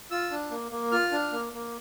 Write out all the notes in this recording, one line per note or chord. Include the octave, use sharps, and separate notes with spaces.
F4 E6
D4
A#3
A#3
F4 F6
D4
A#3
A#3